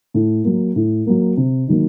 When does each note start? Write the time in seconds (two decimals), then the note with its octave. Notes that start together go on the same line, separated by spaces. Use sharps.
0.14 A2
0.44 F#3 A#3
0.76 A2
1.07 F#3 A#3
1.37 C3
1.68 D#3 F#3 A#3